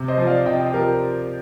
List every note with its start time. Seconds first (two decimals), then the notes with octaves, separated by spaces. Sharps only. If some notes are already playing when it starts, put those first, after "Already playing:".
Already playing: C3
0.08 C5 D#5
0.17 F3
0.27 D5 F5
0.45 C3 D#5 G5
0.60 D#5 G5
0.74 F3 G4 A#4